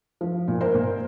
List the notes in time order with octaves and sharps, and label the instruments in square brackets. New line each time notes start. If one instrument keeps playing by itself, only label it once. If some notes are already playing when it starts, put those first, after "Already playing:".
[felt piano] F3
A#2
A#4 C5
A#2